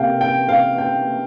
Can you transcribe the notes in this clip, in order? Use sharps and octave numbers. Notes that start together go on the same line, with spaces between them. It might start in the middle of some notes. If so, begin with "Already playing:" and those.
Already playing: C3 A#3 F5 G5
G5
F5
G5